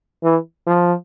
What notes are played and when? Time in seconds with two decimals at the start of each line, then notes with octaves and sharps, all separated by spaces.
0.23 E3
0.67 F3